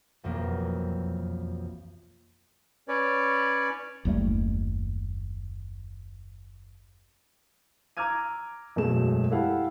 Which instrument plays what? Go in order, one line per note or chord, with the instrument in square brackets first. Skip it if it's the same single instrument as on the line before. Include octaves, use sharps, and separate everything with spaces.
[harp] E1 B1 F2 A#3
[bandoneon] C#4 B4 C#5 D5
[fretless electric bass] F#1 D#2 G3 A3
[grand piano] A#5 D6 E6 F6 G#6 D#7
E1 F#2 G#3 A3 A4 E7
E4 G4 A4 F5 F#5 B5